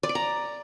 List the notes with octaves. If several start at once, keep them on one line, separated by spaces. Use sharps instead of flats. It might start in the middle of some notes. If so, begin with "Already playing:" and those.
D5
D6
A#5